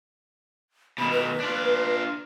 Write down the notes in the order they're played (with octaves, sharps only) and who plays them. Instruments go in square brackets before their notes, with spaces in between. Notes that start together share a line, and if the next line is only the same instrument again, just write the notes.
[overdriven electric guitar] B2 D#3 [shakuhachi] B5
[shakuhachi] B4
[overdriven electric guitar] D4 F4